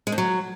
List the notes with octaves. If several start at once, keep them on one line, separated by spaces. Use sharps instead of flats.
G#3
F2
F#3